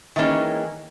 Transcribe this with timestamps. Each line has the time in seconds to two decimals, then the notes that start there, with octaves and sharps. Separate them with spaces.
0.16 D#3 E3 G#3 A#3 C#4